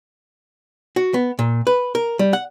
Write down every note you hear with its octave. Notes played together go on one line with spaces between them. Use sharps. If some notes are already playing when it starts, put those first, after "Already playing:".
F#4
B3
A#2
B4
A#4
G3
F#5